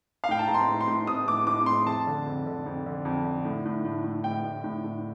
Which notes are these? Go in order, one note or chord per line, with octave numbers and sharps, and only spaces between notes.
F5
A2 G5
A5
A2 A#5
C6
A2
C6
A2
A2 D#6
A2 D6
A2 D6
A2 C6
F2 A5
D3
F2
D3
F2
D3
F2
D3
A2
A2
A2
A2
A2 G5
A2
A2
A2